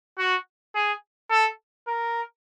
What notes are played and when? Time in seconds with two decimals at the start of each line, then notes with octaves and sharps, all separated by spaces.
0.19 F#4
0.75 G#4
1.31 A4
1.88 A#4